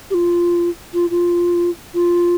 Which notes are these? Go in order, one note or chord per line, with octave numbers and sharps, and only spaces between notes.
G4
F4
F4
F4
F4